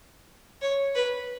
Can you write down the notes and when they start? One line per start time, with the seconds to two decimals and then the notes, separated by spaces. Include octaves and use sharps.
0.62 C#5
0.96 B4